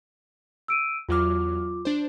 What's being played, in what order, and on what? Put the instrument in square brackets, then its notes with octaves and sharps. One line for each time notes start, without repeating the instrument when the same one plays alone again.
[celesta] E6 D7 D#7
[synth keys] E2 F#3 F6 [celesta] F4 D6
[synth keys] D4 C5